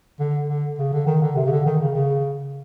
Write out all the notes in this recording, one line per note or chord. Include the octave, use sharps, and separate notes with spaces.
D3
D3
C#3
D3
D#3
D3
C3
C#3
D3
D#3
C#3
C#3